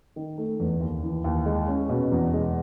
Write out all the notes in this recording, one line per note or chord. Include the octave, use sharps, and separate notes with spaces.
D#3
A3
E2
D#2
E3
D#2
G#3
C#4
B2
E2
G#3